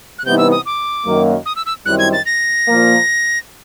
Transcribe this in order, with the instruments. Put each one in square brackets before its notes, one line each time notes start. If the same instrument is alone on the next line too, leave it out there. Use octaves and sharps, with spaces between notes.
[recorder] F#6
[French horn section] C3 E3 G3 B3 D#4 [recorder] G6
[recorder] E6
D#6
D6
[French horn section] F#2 D#3 F#3 A#3
[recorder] D#6
E6
E6
[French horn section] F#2 D#3 G3 C4 E4 [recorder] F#6
[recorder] G#6
A6
A#6
[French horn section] A#2 F3 A#3